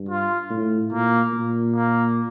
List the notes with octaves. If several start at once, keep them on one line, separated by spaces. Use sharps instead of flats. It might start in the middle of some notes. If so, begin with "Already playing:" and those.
Already playing: G2
F4
A2
A#2 A#3
A#2
A#3